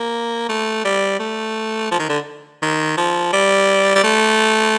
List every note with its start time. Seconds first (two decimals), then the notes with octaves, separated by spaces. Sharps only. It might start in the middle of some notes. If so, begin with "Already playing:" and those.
Already playing: A#3
0.49 A3
0.85 G3
1.20 A3
1.91 F3
1.99 D#3
2.09 D3
2.62 D#3
2.97 F3
3.33 G3
3.95 G3
4.04 A3